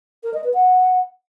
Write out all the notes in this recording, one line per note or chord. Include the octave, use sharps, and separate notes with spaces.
A#4
D#5
B4
F#5